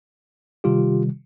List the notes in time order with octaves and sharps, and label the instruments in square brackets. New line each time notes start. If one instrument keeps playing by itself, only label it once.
[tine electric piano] C3 D#3 G3 F4 G4